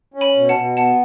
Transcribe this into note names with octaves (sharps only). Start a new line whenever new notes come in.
C#4
G#5 B5
B2
F#5 A5
B2
B3 F#5 A5